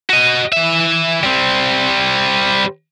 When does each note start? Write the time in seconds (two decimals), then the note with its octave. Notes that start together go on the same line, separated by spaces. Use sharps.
0.10 F#4 D#5
0.53 E3 E5
1.23 G3 C4